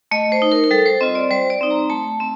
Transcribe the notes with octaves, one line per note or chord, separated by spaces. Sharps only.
A3 D#5
C5
D#4
A#4
A#4
G3 A4
C5
C4 F4 D#5
D5
G3 C5
D5
C4 D#4
A#5
A3 A5
C4